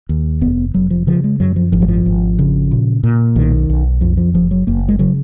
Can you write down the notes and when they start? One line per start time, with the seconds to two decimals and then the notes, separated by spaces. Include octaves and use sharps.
0.09 D#2
0.41 F1 B3
0.74 F1 F#3
0.90 F3
1.07 C#3 F3
1.24 G#3
1.40 F#2 F#3
1.56 F3
1.72 G#1 F3
1.82 F#3
1.88 F3
2.06 G#1
2.39 C#3
2.71 A#2
3.04 A#2
3.36 B1 D#3
3.69 B1
4.01 F2 F3
4.17 F3
4.34 F#1 F3
4.51 F#3
4.67 F#1 A#3
4.88 G#3
4.99 C#3 F#3